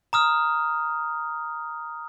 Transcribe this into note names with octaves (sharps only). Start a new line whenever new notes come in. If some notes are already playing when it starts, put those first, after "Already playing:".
A#5 D#6 F6